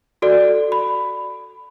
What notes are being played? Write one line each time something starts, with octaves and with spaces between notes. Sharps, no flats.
F#4 A4 D5
B5